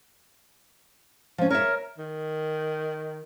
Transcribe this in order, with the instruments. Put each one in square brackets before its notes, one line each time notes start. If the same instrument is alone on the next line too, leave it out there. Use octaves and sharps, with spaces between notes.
[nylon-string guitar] F3 C#4
[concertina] A#4 [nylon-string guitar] C#5 E5
[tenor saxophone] D#3